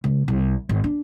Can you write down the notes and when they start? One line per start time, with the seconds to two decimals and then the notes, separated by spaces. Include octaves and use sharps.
0.04 C#2
0.28 C2
0.69 G#1
0.84 D4